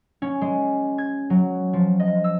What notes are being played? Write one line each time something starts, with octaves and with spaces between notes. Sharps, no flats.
C#4
G#3
G#6
F#3
F3
D#5
E6